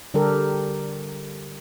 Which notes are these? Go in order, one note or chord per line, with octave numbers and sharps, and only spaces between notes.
D3 G3 G4 A4 A#4